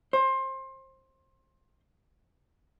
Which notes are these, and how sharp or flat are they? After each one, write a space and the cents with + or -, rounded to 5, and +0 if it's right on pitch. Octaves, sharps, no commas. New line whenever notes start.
C5 +25